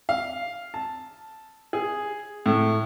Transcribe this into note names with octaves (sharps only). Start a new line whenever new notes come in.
F5
A5
G#4
A2